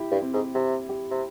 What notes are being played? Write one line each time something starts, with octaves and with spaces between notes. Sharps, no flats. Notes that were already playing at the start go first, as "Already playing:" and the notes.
Already playing: E4 G4
G2
C4
G#2
C3 G4
G4
C3